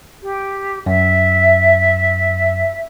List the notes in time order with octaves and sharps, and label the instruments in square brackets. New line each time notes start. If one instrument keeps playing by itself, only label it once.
[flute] G4
[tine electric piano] F#2 [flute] E5